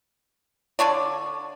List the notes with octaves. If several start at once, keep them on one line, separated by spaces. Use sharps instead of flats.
D3 D4 C#5 D5